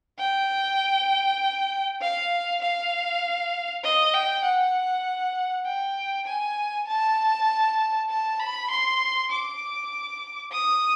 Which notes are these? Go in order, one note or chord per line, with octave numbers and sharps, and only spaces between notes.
G5
F5
F5
D#5
G5
F#5
G5
G#5
A5
A5
B5
C6
D6
D#6